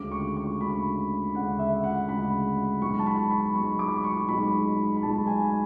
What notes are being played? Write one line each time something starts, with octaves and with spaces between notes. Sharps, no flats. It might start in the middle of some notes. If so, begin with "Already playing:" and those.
Already playing: D2 C#3 G#3 D6
C#6
C#6
D2 C#3 G#3 B5
D2 C#3 G#3 F#5
E5
F#5
D2 C#3 G#3 B5
B1 B2 G#3 C#6
A5
B5
B5
B1 B2 G#3 C#6
D6
C#6
B1 B2 G#3 B5
B5
B1 B2 G#3 A5
G#5